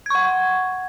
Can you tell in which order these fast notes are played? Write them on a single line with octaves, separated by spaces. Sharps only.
G#6 C#6 F#5